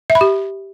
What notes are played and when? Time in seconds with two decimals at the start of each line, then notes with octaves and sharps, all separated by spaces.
0.10 E5
0.15 B5
0.21 G4